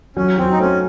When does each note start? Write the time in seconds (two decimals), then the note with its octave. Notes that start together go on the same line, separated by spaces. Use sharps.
0.16 F#3 C#4
0.38 F#3 C4
0.51 D#4
0.59 A3 C#4